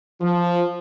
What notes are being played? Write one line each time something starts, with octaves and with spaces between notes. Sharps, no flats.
F3